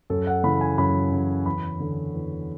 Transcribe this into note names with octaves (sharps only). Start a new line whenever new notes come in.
F#2 A4
F#5
C#3 E3 B5
G#5
F#2 B5
C#3 E3
E2 B5
D3
E2